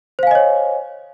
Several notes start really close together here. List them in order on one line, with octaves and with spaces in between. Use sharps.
C5 F5 G#5 D#5 C#5